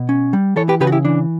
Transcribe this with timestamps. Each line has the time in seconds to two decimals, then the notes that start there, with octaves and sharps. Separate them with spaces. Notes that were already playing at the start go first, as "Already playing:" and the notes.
Already playing: B2
0.09 C#4
0.33 G3
0.56 E3 A4 C#5
0.69 G4 B4
0.80 C#3 G4 B4
0.87 F#4
0.92 E4 G4
1.05 E3 D4